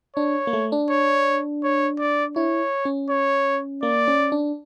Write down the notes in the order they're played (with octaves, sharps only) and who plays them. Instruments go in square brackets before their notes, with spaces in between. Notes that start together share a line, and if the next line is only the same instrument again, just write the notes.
[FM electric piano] D4 [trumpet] C#5
[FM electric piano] A#3
A3
D4
[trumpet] C#5
C#5
D5
[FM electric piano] E4 [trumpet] C#5
[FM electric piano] C#4
[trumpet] C#5
[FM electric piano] A#3 [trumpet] D5
[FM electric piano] C#4
D4